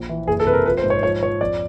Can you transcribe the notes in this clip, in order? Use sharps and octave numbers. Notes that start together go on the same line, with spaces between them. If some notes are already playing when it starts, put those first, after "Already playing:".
Already playing: A#1
E3
F#1 G#4
A4
C3 B4
A#4
F3 B4
C5
G#2
C#5
F3 C#5
F3 C#5
F2 D5